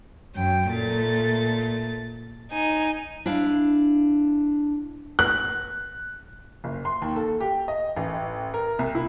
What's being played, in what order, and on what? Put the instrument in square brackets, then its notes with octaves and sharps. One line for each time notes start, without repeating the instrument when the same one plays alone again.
[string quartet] F#2 G5
A#2 A3 A6
D#4 G#5
[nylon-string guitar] D4 E4 F5
[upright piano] F#6
F#1
C6
D#2
A4
G4
D#5
A1
A#4
C2
E4